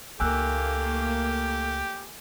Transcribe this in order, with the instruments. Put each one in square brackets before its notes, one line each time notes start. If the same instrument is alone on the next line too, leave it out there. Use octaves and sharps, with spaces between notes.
[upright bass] C#2 D#4 [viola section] A3 A#3 [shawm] G4 [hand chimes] G#5 E6 F#6